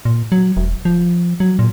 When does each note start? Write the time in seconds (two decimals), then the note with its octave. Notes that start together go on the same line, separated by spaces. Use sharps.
0.05 A#2
0.32 F#3
0.57 E1
0.85 F3
1.40 F#3
1.59 A#2